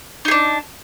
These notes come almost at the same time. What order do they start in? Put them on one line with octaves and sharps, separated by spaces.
D#4 G#4 D4